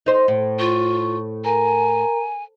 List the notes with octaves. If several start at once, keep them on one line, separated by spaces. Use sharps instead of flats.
D#4 C5
A2
F4 C#6
A#4 G#5 A#5